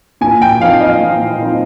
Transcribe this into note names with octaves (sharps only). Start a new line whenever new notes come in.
A#2 G#5
G5
F3 C4 D#4 F5
D#5
A#2
F3 C4 D#4